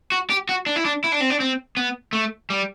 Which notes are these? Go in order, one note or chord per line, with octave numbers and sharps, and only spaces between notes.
F#4
G4
F#4
D4
E4
D4
E4
D4
C4
D4
C4
B3
A3
G3